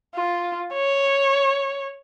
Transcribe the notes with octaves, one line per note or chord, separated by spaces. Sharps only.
F4
C#5